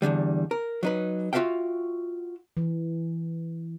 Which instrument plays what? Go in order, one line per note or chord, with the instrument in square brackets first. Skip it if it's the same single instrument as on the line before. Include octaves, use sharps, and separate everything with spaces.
[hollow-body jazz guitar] E2 G#2 D3 G3
A#4
F#3 D#4 B4
F4 F#4 A4 E5 F5 G5
[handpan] E3